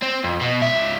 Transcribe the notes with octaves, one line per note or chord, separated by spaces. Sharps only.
C4
F2
B2
C#2 E5